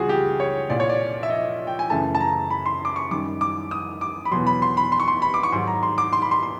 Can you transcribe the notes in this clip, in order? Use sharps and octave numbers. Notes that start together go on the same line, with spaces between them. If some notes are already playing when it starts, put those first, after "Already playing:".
Already playing: C#2 C#3 E3 G3 F4 F#4 G#4
G4
C#5
C2 A#2 F3 D5
C#5
D5
E5
D#5
G5
G#5
F#2 C#3 E3 A3 A5
A5
A#5
B5
C6
D6
C#6
F#2 D#3 G3 D6
D6
D#6
D6
B5
E2 B2 F#3 C6
B5
C6
B5
C6
C#6
C6
B5
D6
C#6
G#2 D#3 F#3 C6
A#5
C6
D6
C6
B5
C6
C6